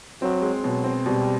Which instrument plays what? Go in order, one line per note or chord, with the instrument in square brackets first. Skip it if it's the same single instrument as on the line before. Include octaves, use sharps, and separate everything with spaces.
[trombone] F#3 [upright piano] C4
[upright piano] G#3
[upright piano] B2 [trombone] F#3
[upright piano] C4
[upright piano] B2 [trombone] G3